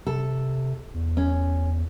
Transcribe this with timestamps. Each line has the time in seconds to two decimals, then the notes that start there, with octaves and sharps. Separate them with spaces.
0.07 C3 A4
0.94 E2
1.17 C#4